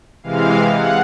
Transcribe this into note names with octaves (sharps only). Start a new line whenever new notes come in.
C3 E3 G#3 F5
F#5